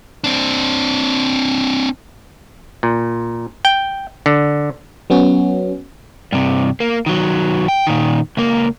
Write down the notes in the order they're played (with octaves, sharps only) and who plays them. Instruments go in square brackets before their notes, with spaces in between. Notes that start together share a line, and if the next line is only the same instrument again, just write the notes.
[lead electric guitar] C4 D4
[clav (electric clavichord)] A#2
G5
D3
[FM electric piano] F#3 B3 C#4 F#4
[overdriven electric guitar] G2 C3
A#3
D#3 F#3
G5
A#2 D#3
C#2 A#3